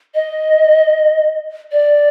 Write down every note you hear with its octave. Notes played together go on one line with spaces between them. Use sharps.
D#5
D5